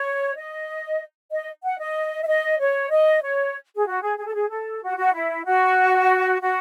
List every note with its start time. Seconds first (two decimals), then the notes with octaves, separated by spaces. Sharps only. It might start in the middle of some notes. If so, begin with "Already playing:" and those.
Already playing: C#5
0.35 D#5
1.31 D#5
1.63 F#5
1.79 D#5
2.22 E5
2.27 D#5
2.59 C#5
2.90 D#5
3.22 C#5
3.75 G#4
3.87 F#4
4.02 G#4
4.18 G#4
4.26 A4
4.34 G#4
4.50 A4
4.82 F#4
4.97 F#4
5.13 E4
5.45 F#4
6.41 F#4